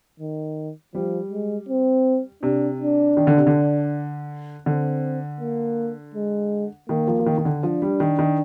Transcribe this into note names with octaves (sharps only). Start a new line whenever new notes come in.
D#3
F3 G3
G#3
C4
C3 D4
D4
D#3
D3
C3
D3
D3 C4
A#3
G#3
D#3 A#3
F3
F3
D#3
D#3
D3
F3 D4
G3
D#3
D#3